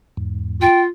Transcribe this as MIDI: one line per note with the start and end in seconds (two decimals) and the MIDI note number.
0.17 0.68 40
0.17 0.68 44
0.62 0.89 65
0.62 0.81 79